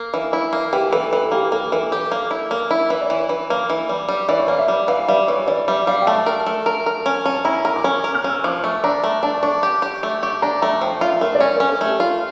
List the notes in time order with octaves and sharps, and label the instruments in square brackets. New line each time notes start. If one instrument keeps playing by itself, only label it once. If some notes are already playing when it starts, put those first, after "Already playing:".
Already playing: [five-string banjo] A#3
E3
E4
A#3
[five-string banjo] E3 [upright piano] G4
[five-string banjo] E3 [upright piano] A4
[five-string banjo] E3 [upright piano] A4
[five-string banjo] A#3 [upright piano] G4
[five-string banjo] A#3 [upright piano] A4
[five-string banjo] E3 [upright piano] A#4
[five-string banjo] G4 [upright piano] A4
[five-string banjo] A#3
E4
[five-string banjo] A#3 [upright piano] A#4
[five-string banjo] E4
E3
[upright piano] D5
[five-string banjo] E3 [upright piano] C#5
[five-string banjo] E3
A#3
E3
G3
G3
[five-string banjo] E3 [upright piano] D5
[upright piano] C#5
[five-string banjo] A#3 [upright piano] D5
[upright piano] E5
[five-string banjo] G3
[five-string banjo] E3 [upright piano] F5
[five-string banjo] G3 [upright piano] E5
[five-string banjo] E3 [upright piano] C#5
[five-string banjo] E3 [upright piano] D5
[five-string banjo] G3 [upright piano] E5
[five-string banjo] G3 [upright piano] F5
[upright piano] G5
[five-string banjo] A3 [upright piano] A5
[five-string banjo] A#4
A3
A#4
A#4
C#4
[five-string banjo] C#4 [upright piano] A5
[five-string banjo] E4 [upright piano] A#5
[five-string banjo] A#4 [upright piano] A#5
[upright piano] D6
[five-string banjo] C#4 [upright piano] C#6
[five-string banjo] A#4
[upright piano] F6
[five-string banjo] C#4
[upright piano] E6
[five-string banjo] F3 [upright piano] D6
[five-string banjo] A3 [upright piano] C#6
[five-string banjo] D4 [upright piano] A#5
[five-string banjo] A3 [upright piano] A#5
[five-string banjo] D4 [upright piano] A5
[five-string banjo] D4 [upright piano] C#6
[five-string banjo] G4
G4
A3
[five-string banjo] G4 [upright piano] C#6
[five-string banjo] D4 [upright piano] A#5
[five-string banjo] A3 [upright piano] A#5
[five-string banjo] F3 [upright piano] G5
[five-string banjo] F4 [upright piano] E5
[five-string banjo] A3 [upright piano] A#4
[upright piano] D5
[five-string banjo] C#4 [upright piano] C#5
[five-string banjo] C#4 [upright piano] A#4
[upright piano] A4
[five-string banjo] A3 [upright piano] G4
[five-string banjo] F4